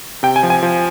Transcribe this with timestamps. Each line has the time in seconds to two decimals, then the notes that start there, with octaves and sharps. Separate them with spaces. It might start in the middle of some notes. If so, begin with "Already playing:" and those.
0.23 C3 G5
0.36 G#5
0.43 F3
0.50 G#5
0.63 F3